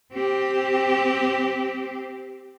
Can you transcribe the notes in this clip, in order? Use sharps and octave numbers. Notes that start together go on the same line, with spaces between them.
C4 G4